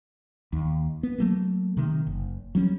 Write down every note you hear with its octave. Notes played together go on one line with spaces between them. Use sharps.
D#2
B3
F#3 A3 A#3
C3 D#3
F#1
F#3 G3 C#4